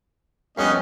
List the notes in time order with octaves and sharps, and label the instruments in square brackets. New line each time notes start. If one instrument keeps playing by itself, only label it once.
[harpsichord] F2 G3 D4 [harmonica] B3 C#4 D#5